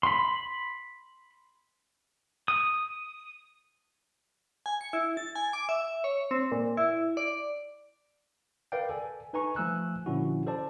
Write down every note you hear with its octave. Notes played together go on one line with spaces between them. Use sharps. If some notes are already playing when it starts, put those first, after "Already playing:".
B5 C6
D#6
G#5
C#7
E4
A6
G#5
D6
E5
C#5
C4
A#2
E4
D5
A#4 B4 D5 F5 G5
A4 G#5
D#4 B4 G#5 A#5 C#6
F3 A3 G#5 E6 F#6
A#2 D3 F3 C#4 E4 F#4
A4 C5 D5 A5